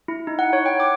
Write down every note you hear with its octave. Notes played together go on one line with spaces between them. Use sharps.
E4
D#4
F#5
C#5
G5
D6